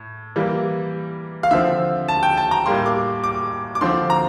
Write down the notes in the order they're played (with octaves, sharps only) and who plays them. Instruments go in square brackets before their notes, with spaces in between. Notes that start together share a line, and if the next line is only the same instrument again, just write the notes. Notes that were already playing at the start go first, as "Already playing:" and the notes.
Already playing: [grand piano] A2
E3 G3 A#3
F5
D3 F3 C4 E5
A5
G5
A5
A#5
A2 G3 A#3 C6
D6
D6
D6
D3 F3 C4 C6
A#5